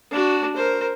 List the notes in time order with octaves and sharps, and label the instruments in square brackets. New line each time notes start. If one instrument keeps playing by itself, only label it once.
[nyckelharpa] D4 F#4
A#4 C5